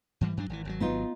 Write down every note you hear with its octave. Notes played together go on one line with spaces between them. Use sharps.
G#2 E3 G3
G2 F#3 D4
G#1 D3 E3
G#1 C#3 F#3
B3 D#4 F4